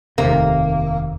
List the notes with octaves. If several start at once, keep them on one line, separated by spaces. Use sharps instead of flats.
F1 D#2 C3 A#3